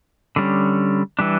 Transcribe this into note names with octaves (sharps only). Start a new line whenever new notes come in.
D3 G3 C#4
E3 G3 D4